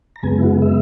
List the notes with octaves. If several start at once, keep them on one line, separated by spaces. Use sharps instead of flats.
A#5
F#2 C#3 G#3 B3 G#5
E4
F#4
G#4
E5